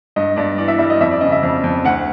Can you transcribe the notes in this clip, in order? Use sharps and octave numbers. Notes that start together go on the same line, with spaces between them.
G2 D#5
G2 D5
E3 D5
E5
G3 E5
D#5
F2 E5
D5
C#3 D#5
E5
F2
F2
D2 F#5